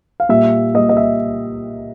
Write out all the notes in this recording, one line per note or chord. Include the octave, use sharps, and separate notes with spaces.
F5
A#2 G3 E5
A#2 G3 D#5
D#5
E5